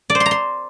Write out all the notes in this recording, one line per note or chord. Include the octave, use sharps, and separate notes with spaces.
D5
C5
C6
A#5
C6